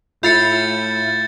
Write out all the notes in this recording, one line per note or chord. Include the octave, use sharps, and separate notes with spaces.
A2 F4 E5 B5 G6 A6 C#7